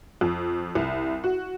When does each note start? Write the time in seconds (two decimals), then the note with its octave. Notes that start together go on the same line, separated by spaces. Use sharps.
0.21 F2
0.75 C2
1.24 F#4